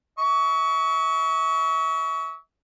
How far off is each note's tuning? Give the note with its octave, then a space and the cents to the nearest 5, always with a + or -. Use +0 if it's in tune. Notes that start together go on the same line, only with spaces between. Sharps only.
E5 -40 C#6 +25